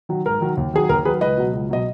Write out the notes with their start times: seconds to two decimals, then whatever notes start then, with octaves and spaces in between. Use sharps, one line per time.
0.09 D#3 F#3
0.25 G#2 A#4
0.41 D#3 F#3
0.57 D#2
0.73 D#3 F#3 G#4
0.89 D#2 A#4
1.05 D#3 F#3 G#4 B4
1.21 C#2 B4 D#5
1.37 B2 F#3
1.53 C#2
1.69 B2 F#3 D#5